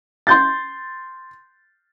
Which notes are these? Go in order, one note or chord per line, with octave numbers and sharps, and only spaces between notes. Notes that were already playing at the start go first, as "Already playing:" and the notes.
C6 G6 A6